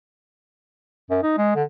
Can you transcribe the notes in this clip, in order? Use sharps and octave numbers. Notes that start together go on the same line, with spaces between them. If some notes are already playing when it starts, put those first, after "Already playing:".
F#2
D#4
G#3
D3